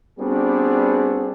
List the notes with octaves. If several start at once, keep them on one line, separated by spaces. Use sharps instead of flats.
G3 B3 C4 D4 F#4 G#4